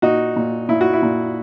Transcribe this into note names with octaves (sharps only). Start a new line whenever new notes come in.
A#2 D#4 F#4
A#2
A#2 E4
F#4
E4
A#2